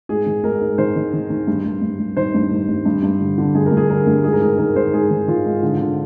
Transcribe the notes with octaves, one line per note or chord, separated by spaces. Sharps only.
G#2 G#4
D#3
G#2 A#4
G#2
D#3 C5
D#3
D#3
D#3
G2
G2
G2
G2
D#3 C5
G2
D#3
G2
G2
G2
D3
D3
G2 G#4
A#4
G2 G#4
D3 A#4
G2
G#2 G#4
A#4
D#3 G#4
D#3 A#4
D#3 C5
G#2 G#4
D#3
D#3 F4
G#2
D3
D3